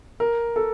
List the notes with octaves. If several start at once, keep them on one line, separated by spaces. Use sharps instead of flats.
A#4
A4